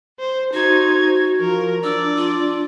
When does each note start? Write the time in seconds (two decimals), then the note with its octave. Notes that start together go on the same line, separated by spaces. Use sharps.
0.19 C5
0.53 D#4 F#4 C5 G#6
1.40 F3 A#4
1.84 D4 D5 E6
2.17 F4